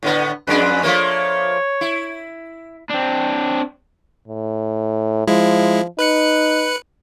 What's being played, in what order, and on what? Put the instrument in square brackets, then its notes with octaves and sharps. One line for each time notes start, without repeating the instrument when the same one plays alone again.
[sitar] A2 D3 B3
[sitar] F2 G#3 D4 [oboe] B4
[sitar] F3 A3 A#3 [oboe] C#5
[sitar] E4
[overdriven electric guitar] C4 D4
[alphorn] A2
[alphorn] F3 [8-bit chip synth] G#3 E4
[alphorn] D#4 [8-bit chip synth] B4 F#6 C#7